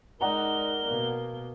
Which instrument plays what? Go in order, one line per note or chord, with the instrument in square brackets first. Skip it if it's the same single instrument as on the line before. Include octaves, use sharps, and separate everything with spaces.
[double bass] G#3 D#4 [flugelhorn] A#4 [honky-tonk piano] D5 F#5 A#5 [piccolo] G7
[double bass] B2 A#3